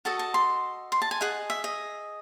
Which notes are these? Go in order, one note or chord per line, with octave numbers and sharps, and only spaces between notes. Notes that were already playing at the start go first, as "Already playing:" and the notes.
F#4 A4 D#5 A5
A5
C6
C6
A5
G#5
G#4 D#5 F#5
E5
D#5